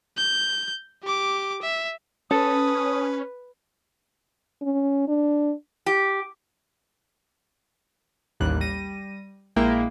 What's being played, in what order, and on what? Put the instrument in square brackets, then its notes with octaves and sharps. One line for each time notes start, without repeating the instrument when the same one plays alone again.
[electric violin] G6
G4 D6
E5
[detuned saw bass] C#4 [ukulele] A4 [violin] B4 [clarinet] D#6
[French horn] C#4
D4
[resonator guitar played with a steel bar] G4
[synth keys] A1 D#2 G3 F#6
G3 A#6 D#7
A#1 G#3 A#3 E4 G5